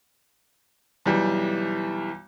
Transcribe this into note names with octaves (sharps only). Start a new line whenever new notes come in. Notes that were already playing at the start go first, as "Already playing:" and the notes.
B1 E3 G3